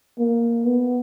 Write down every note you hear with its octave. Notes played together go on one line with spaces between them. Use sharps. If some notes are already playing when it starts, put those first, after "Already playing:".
A#3
B3